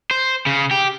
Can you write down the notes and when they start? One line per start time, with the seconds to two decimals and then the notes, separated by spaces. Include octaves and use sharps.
0.11 C5
0.46 C#3
0.71 G4